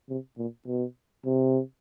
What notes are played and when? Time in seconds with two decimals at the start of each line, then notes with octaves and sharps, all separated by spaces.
0.09 C3
0.38 A#2
0.67 B2
1.26 C3